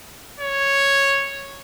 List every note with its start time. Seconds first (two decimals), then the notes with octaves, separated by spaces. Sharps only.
0.40 C#5